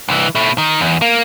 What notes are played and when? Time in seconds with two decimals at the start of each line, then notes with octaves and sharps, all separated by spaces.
0.09 C2 E3
0.35 B2 A3
0.58 D#3
0.81 E2
1.02 A#3